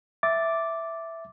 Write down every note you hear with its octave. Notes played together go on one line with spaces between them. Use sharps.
E5 D6 A6